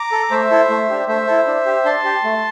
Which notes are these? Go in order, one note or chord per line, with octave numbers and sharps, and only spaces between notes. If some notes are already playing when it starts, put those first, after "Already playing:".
Already playing: A#5 D6
A4
A3 C5 E5
E4 A4
A3
D4 G4
A3 C5 E5
E4 A4
D4
G4
D4 A5 C6
G4
A3